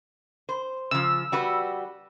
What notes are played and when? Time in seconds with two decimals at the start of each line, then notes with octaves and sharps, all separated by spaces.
0.49 C5
0.91 C#3 F3 E6
1.32 G3 F#4 B4